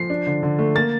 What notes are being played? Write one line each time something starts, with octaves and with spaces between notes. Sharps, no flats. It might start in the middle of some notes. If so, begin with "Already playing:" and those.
Already playing: F3 C7
D4
D3
D3
A3
A#3 A6